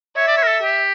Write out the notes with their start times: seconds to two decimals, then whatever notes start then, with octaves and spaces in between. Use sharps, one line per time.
0.17 C#5 E5
0.28 D5
0.37 C#5
0.43 A#4
0.47 A4
0.62 G4